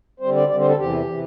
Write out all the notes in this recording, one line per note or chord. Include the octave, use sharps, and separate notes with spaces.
D3 G3 C4 C5
D5
D3 G3 C4 D5
C5
A4
E2 C3 E3 G4
C3 E3